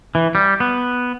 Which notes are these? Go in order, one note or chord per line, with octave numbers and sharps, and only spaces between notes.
E3
G3
B3